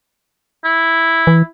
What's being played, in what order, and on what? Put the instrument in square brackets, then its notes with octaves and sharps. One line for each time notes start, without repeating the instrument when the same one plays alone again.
[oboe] E4
[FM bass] E3